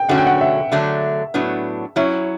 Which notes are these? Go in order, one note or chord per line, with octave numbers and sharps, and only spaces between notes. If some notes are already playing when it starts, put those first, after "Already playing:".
Already playing: G5
D3 F#3 A3 C#4 F#4 F#5
G5
F#5
E5
D3 F#3 A3 D4
A2 F#3 B3 D4
F#3 C#4 E4 C#5